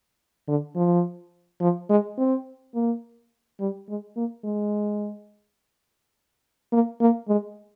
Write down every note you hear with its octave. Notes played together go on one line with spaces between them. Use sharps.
D3
F3
F3
G#3
C4
A#3
G3
G#3
A#3
G#3
A#3
A#3
G#3